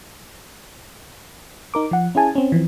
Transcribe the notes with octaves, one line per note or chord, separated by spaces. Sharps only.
D#4 A#4 D6
F3 F#5
C#4 E4 G#4 G#5 A5
C4 C#4
E3 F3 C4